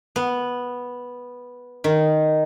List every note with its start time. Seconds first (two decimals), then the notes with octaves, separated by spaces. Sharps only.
0.16 B3
1.84 D#3